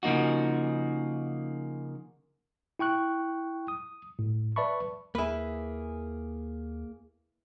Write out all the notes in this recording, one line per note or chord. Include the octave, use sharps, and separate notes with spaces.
C#3 F3 A#3 D#4 F#4
E4 G5 C#6 F#6
D#6
A2
B4 D5 E5 A5 B5 C#6
D#2 A#3 E4 G#4 B4